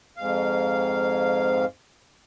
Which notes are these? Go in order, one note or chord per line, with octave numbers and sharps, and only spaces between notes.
F2 G#2 F5